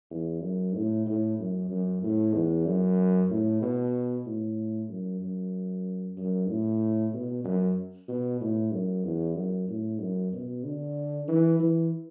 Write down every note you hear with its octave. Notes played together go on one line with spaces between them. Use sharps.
E2
F#2
A2
A2
F#2
F#2
A2
E2
F#2
A2
B2
A2
F#2
F#2
F#2
A2
B2
F#2
B2
A2
F#2
E2
F#2
A2
F#2
B2
D3
E3
E3